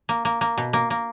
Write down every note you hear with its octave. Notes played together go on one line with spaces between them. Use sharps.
A#3
A#3
A#3
B2
A#3
A#3